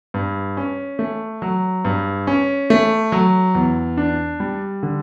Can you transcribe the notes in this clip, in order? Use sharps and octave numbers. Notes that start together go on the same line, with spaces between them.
G2
C#4
A3
F#3
G2
C#4
A3
F#3
E2
D4
G3
D3